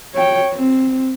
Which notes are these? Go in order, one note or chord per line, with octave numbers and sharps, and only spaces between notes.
C#5 G5
C4